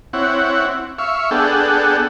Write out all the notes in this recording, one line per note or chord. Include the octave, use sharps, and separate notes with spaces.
C4 E4 C#5 F#5
E5 F5 C#6
B3 D4 G#4 A4 F#5 G5